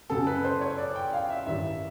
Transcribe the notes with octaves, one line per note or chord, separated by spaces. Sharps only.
F#2 C#3 F#3 A4
B4
C5
C#5
D5
G5
F5
E5
A1 G2 D#3 E5